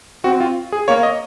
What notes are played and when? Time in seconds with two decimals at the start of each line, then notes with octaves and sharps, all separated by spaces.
0.24 C4 F#4
0.40 F4
0.72 G#4
0.88 A#3 C#5
1.03 D#5